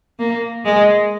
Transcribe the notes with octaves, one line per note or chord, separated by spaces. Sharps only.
A#3
G#3